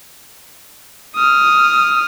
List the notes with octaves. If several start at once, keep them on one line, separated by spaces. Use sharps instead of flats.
D#6 F6